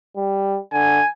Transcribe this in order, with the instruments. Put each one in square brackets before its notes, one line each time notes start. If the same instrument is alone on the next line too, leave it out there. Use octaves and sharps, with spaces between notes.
[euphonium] G3
[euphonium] D3 [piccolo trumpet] G#5